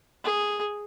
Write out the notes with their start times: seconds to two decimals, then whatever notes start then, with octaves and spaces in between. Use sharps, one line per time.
0.24 G#4